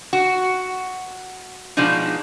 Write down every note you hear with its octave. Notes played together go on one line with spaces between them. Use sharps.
F#4
B2 F3 G#3 D4 D#4